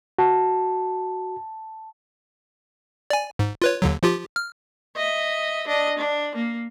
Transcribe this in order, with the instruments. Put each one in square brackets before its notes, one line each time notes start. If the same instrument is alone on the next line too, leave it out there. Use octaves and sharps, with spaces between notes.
[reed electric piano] F#4 [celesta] A5
[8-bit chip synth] D5 G#5
G#2
F4 B4 C#5
D#2 D3 F#3
F3 F4 G4
F6
[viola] D#5 E5
D4 D#5
D4
A#3